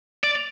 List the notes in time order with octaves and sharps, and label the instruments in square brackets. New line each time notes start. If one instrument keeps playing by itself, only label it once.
[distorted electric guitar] D5